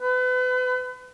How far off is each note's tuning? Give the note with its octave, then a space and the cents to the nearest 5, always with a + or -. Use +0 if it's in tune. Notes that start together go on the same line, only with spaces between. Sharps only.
B4 +35